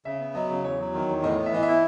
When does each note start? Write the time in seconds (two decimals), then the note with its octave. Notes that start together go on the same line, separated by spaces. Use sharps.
0.05 C#3 E5
0.20 B3
0.35 F#3 D#5
0.49 C#3
0.64 E2 C#5
0.79 F#3
0.94 D#3
1.08 E2
1.23 A2 D#5
1.38 B3
1.46 E5
1.52 E3 D#5
1.63 E4 E5